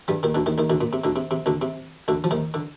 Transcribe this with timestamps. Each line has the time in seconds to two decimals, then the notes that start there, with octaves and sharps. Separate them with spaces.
0.08 G2 G3
0.23 D#2 D#3
0.35 D2 D3
0.46 D#2 D#3
0.58 D#2 D#3
0.70 D2 D3
0.81 A#2
0.93 C3
1.04 D2 D3
1.16 C3
1.31 C3
1.46 D2 D3
1.61 C3
2.08 D2 D3
2.24 F3
2.31 D#2 D#3
2.54 D3